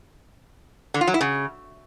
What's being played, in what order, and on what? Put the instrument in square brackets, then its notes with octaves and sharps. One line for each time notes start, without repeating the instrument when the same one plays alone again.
[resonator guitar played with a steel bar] D3
F4
F#3
E4
C#3